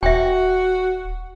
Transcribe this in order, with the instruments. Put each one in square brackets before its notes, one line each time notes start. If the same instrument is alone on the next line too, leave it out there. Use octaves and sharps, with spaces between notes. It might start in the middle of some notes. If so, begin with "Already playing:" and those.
[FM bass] D#1 [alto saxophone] F#4 [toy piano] E5 G5